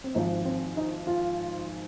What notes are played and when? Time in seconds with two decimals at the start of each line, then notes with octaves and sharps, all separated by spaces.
0.04 C4
0.15 G#1 G#2 F3 D#4
0.45 C4
0.77 D#4
1.07 F4